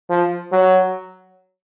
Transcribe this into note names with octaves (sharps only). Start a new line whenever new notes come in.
F3
F#3